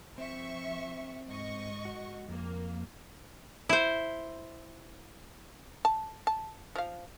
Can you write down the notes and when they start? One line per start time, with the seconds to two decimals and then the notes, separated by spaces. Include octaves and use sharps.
0.18 F3 C4 E5 C#6
1.27 G#2 D#5 C#6
1.85 F#4
2.29 F2 A#3
3.69 E4 C5
5.85 A5
6.27 A5
6.76 F3 F5